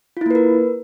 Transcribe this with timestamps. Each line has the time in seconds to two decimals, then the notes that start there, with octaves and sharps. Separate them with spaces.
0.17 F4
0.21 E4
0.26 A#3
0.31 B4
0.35 A#4